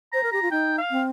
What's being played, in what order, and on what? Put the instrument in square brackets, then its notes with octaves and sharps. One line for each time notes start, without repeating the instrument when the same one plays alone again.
[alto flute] C5 [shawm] A#5
[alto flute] A#4
[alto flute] G4 [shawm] A#5
[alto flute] F4
[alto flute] D#4 [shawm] G5
[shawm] F5
[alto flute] C4